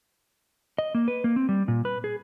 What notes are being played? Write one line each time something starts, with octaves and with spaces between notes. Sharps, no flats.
D#5
A#3
B4
A#3
C4
G3
A#2
B4
G#4